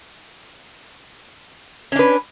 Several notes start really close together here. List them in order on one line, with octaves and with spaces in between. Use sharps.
C#4 D4 B4